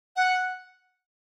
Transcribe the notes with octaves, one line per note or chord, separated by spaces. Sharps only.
F#5